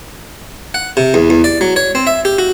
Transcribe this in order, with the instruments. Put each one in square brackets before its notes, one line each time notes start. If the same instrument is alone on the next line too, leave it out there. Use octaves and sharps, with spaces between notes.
[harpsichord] F#5
C3
E2
E2
D5
F#3
C#5
C4
E5
G4
F#4